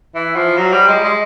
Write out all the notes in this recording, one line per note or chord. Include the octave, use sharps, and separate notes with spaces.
E3
F3
F#3
G3
G#3
G#3